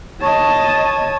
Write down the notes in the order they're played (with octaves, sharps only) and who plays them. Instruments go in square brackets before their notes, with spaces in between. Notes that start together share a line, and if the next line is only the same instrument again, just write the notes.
[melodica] C#5 [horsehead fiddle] D#5 A5